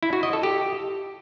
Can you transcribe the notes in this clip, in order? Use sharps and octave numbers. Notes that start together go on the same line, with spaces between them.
E4
F#4
D#5
A4
G4